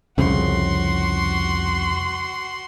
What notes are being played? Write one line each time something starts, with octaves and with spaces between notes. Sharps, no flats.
C2 F2 C#3 F#4 C6